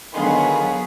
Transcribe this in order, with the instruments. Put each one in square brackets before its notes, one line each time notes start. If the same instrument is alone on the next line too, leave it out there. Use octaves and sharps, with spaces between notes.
[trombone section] D3 D#3 [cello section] F#3 B3 B4 [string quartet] G#4 [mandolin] F5 C6